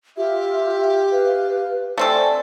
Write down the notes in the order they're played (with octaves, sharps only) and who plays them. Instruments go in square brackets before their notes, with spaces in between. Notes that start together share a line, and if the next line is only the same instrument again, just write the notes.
[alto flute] F4 [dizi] G4 [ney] E5
[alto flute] B4 [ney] F5
[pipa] A3 C4 A4 [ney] D5 [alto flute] G#5